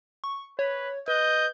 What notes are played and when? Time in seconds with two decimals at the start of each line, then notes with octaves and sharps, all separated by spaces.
0.24 C#6
0.59 B4 C#5
1.08 B4 D#5 G6